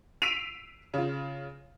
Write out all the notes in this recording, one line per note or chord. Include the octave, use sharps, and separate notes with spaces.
E6 B6 C7 D7 D#7 F7
C#3 F4